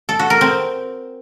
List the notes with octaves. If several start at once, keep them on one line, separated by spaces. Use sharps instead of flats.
A4
F#4
A#4
C4